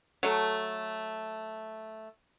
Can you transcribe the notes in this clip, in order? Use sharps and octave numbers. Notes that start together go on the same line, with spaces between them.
F#3 A3